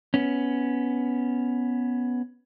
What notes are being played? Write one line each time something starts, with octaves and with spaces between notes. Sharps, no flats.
B3 C#4